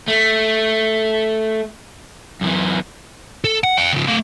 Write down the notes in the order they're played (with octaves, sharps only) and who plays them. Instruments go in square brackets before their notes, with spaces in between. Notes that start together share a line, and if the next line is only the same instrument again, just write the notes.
[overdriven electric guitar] A3
F#2 E3
[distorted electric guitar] A4
F#5
F5 G5
C#3 F3
A3 F5